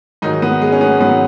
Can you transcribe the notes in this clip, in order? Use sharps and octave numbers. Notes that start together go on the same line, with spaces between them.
G#2 D#3 F#3 D#4
B3
G#3
C#4
B3
G#2 D#3 F#3 B3